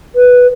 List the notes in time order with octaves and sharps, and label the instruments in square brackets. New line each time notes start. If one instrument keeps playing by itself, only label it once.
[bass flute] B4